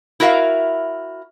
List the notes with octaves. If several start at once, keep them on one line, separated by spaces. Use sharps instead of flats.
E4 F#4 A#4 E5 F5